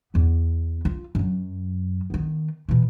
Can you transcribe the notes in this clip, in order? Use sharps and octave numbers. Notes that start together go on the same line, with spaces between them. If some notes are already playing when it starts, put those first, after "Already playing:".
E2 B3
F4
F#2 F#3
D#3 B3
B2 E3